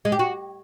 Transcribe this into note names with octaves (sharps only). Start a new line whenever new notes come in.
G#3
G4
F#4